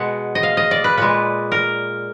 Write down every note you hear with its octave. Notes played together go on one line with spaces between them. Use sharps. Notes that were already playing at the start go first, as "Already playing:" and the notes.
Already playing: B2 G#3 F#5
D#5
F5
D#5
D5
B4
A#2 G#3 B4
A#4